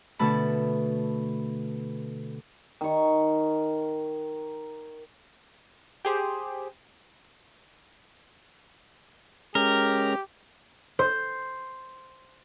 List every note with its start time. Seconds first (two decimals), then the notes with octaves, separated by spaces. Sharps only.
0.19 B2 D3 A3 A5 B5
2.81 D#3 C#6
6.05 G4 G#4 C5
9.55 G#3 C#4 G4 A#4
10.99 C5